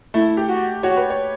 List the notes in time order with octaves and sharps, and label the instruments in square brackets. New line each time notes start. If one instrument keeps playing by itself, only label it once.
[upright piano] A3 [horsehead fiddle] E4
[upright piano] G4
[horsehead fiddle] F#4
[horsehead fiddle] F#4 [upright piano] C#5
[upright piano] B4
C#5